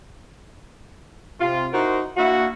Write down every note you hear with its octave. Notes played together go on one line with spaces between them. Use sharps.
C3 F4
D#4 E4 F#4 A#4 C5
A#3 D4 E4 F#4